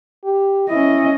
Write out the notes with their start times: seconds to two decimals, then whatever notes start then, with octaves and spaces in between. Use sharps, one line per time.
0.25 G4
0.69 C#4 E4 D#5